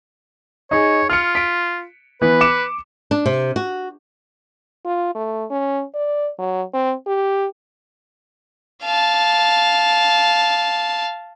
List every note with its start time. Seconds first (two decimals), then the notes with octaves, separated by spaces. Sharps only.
0.71 D#4 G#4 C#5
1.10 F4 F6 C#7
1.35 B6 D7
2.22 E3 B3 B4
2.41 D6 C#7 E7
3.11 D4
3.26 C3
3.56 F#4
4.85 F4
5.15 A3
5.50 C#4
5.94 D5
6.39 F#3
6.74 C4
7.07 G4
8.83 F5 A5